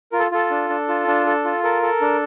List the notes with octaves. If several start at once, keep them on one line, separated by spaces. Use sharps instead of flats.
F4 A#4
A4
F4 A4
D4
D4
F4
D4
A4
F4
A4 A#4
A4
D4